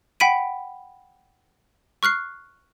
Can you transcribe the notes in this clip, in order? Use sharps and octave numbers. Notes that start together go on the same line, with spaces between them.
F#5 G5 B5 B6 D7 D#7
C#6 F6 F#6 C7